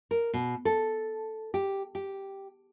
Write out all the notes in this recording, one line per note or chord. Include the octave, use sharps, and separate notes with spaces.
A#4
B2
A4
G4
G4